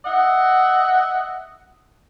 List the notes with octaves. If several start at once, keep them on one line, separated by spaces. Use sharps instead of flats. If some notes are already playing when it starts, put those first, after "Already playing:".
D#5 E5 F#5